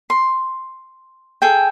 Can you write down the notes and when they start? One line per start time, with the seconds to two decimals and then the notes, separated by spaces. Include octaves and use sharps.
0.10 C6
1.42 G#4 A4 G5